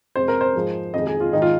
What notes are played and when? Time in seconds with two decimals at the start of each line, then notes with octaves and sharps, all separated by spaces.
0.16 F2 C3 G#3 C5
0.28 A#4
0.41 C5
0.54 G#2 F3 G#3
0.94 F2 D#3 G#3 D#5
1.07 G#4
1.21 F4
1.33 G#2 D#3 G#3 D#4
1.42 F4